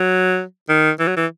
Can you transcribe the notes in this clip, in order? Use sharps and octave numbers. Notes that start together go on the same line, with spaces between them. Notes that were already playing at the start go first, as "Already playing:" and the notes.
Already playing: F#3
D#3
E3
F#3
E3